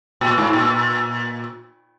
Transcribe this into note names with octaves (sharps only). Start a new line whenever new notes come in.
A#2
G#2
A#2